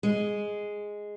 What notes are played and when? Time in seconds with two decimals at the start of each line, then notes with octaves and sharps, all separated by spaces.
0.03 G#3